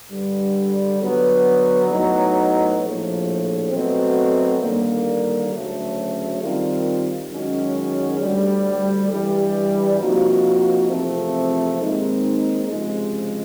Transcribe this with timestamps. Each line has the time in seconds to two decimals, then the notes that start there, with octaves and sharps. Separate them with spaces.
0.11 G2 D3 G3
1.02 D3 F#3 B3
1.92 A2 F#3 B3 D#4
2.82 A#1 A2 F3
3.71 B2 F#3 A3 C4
4.61 D#2 D3 G3 A#3
5.51 D2 C#3 F#3 A3 C#4
6.40 D#3 G3 C4 F4 A#4
7.30 F#2 D#3 G#3 C#4 F#4
8.20 D2 D3 G3
9.09 G2 E3 G3
10.00 C3 F3 A#3 D#4 F#4
10.90 E2 C3 F3 A3 C4
11.79 D#2 D#3 G#3 C4 D#4
12.69 C#2 C3 F3 G#3